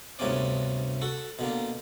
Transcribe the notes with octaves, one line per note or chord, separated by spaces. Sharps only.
D2 G2 C3 B3 C#4 D5
F#4 A4
B2 D3 A#3